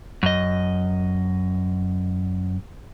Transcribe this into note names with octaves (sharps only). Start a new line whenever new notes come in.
F#2 D#5